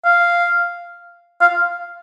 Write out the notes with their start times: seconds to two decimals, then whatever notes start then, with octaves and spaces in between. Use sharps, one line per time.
0.05 F5
1.41 F5